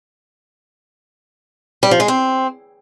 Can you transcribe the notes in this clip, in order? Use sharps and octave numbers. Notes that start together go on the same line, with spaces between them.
G3
F3
G#3
C4